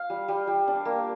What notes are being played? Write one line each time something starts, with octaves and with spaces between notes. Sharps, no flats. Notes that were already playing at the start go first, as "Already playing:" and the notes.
Already playing: F5
G3
G3
G3
D4
A#3